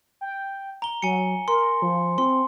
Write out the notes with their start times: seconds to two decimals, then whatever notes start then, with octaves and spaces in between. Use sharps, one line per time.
0.21 G5
0.82 A#5 G7
1.02 F#3 G#5 C#7
1.48 A#4 C6
1.82 F3
2.18 C4 C6